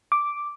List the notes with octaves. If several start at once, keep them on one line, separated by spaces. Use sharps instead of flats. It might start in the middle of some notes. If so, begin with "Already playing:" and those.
D6